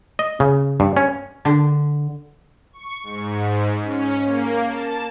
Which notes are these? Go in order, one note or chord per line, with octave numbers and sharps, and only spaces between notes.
D#5
C#3
G2
C#4
D3
C#6
G#2
G#2
C#4
A#3
A5